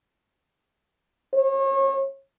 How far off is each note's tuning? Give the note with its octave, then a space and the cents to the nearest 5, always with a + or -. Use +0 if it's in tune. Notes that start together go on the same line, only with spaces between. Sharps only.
C#5 -35